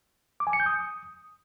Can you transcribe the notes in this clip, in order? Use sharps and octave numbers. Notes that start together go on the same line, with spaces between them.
D6
G#5
C#7
G6
D#6